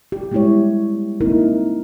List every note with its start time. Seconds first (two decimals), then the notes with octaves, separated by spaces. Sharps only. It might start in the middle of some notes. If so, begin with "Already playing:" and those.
0.12 G4
0.32 G3 G#3 B3 E4 G4 C#5
1.21 A#3 C4 D#4 E4 A#4